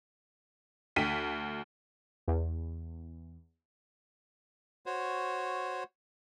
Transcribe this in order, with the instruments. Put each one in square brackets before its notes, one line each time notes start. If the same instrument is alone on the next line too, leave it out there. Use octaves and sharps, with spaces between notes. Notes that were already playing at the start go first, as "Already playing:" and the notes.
[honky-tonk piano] D2 B6 D#7
[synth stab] E2
[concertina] F#4 C5 C#5